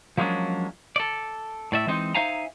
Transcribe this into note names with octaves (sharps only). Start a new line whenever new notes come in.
F3 F#3 G#3 A#3 C#4 D4
A4 D5
A2 D5 E5
E3 G#3 C4 D#4
D#4 C5 E5 F5 G#5 A#5